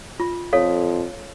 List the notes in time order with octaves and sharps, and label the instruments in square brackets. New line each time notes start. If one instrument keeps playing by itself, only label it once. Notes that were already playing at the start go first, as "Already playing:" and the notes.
[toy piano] F4
[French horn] F2 [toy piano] A4 C#5 F5